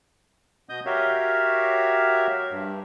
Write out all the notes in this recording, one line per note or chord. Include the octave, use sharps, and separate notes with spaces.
B2 B3 D#5 D#6 G6
F#4 G4 A#4 C#5 E5 F5
G2